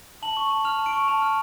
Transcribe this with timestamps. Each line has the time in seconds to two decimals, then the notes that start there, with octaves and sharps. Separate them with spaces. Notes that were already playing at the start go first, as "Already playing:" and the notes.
0.23 A5 F#7
0.37 C#6
0.50 A5
0.65 F6 F7
0.79 A5
0.86 D7
0.93 C#6
1.08 A5 F7
1.22 F6